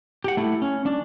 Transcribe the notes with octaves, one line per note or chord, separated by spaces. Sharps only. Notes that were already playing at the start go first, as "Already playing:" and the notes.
G4 F#5
A3 E4
C#4
D4